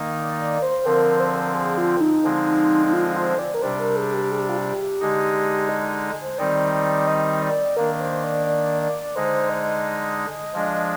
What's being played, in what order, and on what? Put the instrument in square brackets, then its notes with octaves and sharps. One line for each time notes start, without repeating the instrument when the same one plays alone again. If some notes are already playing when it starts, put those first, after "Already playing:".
Already playing: [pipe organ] D#3 A#3 D#4
[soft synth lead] D5
D5
C5
[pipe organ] D3 F3 C4 [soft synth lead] A#4
[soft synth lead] C5
A#4
G#4
A#4
G#4
F4
D#4
[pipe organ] D3 F3 G#3 C4
[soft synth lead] D#4
F4
C5
D5
A#4
[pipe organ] C3 G3 D4 [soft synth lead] C5
[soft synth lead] A#4
G#4
G4
G#4
G4
F4
G4
[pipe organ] D3 G#3 D#4
[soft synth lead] D#5
C5
[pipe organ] D#3 G3 C4 D#4 [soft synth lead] D5
[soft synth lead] D5
D#5
D5
[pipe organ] D#3 A#3 D4 [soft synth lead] A#4
[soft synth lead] A#4
C5
D5
D5
D5
[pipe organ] D3 G#3 D#4 [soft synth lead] C5
[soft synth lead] D#5
[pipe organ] F3 G#3 D4